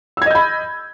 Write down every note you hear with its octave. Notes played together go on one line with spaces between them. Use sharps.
D#5 B5 E6 G6 G#6